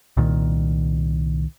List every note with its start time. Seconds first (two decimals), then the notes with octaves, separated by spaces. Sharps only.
0.17 C2 A#2 D#3